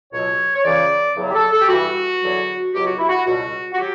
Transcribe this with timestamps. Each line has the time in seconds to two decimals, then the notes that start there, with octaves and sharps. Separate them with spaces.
0.11 C#2 B2 F#3 C#5
0.54 C#5
0.64 C#2 C#3 E3 D5
1.16 E2 C#3 F#3
1.29 G4
1.34 A4
1.52 A4
1.61 G4
1.68 G2 E3 G3 F#4
2.21 E2 D3 F#3
2.73 C#2 B2 F#3 G4
2.85 F#4
2.97 E4
3.08 F#4
3.26 C#2 B2 G3 F#4
3.73 F#4
3.78 F#3 G4